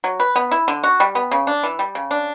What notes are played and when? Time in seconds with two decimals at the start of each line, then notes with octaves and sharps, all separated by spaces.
0.04 F#3
0.20 B4
0.36 B3
0.51 E4
0.68 D3
0.84 F#4
1.00 G3
1.15 B3
1.31 C#3
1.47 D4
1.63 E3
1.79 G3
1.95 C#3
2.11 D4